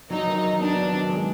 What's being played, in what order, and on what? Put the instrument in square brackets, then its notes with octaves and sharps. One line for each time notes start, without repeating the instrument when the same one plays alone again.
[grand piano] F#3 [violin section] D#4
[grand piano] D#3
D#3
[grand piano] B3 [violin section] D4
[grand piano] F#3
D#3
G#3